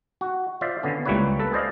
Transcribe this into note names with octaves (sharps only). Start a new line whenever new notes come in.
F#4
F4 C5 D5 E5
D3 B3 C#4
C#2 G3 A#3 E4 B4 C#5
A4 B4
G#4 C5 D5 D#5 F5